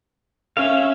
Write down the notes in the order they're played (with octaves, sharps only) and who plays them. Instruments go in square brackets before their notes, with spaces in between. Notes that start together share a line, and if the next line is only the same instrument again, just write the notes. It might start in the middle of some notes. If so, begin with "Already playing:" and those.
[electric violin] C#4 E5 [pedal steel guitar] F5